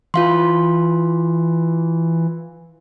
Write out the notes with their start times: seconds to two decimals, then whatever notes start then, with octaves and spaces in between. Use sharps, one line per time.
0.14 E3 F4 F5 C6